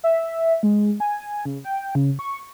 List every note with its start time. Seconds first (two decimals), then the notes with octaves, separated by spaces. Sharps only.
0.04 E5
0.63 G#3
1.00 G#5
1.45 C#3
1.64 G5
1.95 C#3
2.19 C#6